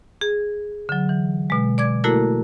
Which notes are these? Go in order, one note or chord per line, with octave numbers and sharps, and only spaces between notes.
G#4
D3 F#3
E3
B2 G#3
D5 D6 G#6
A3 A#3 E4 F#4 A4 A#4